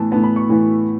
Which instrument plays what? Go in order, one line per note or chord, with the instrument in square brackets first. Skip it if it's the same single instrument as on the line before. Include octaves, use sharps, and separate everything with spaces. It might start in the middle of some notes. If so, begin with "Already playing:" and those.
Already playing: [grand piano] A2 E3 B3 A5
A2 E3 B3 A5
B5
C#6
A2 E3 B3